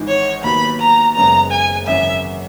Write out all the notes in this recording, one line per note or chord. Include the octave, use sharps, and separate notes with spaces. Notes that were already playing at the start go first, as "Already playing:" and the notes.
Already playing: G#1 G#2 E3 G#3 D#4
C#5
D#2 D#3 F#3 B3 B5
A#5
F#1 F#2 C#3 G#3 B3 A#5
G#5
G#1 F#2 C#3 E3 E5